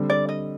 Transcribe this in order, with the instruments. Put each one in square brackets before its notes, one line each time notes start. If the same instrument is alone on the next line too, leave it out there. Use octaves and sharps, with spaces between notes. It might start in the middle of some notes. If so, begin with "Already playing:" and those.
Already playing: [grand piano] D3 G3 C4
[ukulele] D5
D#5